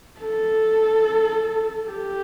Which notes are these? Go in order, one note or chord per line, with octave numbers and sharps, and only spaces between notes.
A4
G4